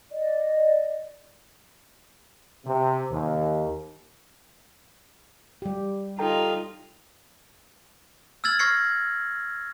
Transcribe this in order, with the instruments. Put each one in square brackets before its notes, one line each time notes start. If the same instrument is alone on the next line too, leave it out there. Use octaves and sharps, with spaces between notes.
[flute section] D5 D#5
[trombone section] C3
D#2
[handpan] G3 G4
[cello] D#4 F4 [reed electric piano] A4 G5 A#5
[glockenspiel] E6 F6 G#6 A6 F#7
C#6 F6 G#6 A#6 C7 C#7